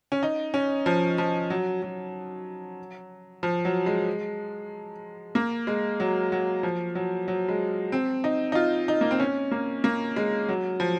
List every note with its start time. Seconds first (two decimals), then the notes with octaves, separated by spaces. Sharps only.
0.12 C#4
0.23 D#4
0.54 C#4
0.86 F3
1.18 F3
1.50 F#3
1.82 F#3
3.43 F3
3.65 F#3
3.86 G#3
5.35 A#3
5.67 G#3
6.00 F#3
6.32 F#3
6.63 F3
6.95 F#3
7.28 F#3
7.49 G#3
7.92 C4
8.24 D#4
8.52 D#4
8.55 F4
8.88 D#4
9.01 A#3
9.11 C4
9.19 C#4
9.51 A#3
9.84 A#3
10.16 G#3
10.49 F#3
10.80 F3